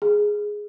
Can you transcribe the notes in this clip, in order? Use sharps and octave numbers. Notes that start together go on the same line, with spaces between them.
G#4